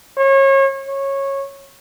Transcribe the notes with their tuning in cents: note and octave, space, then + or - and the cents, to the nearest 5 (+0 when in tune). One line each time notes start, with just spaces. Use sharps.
C#5 -30
C#5 -15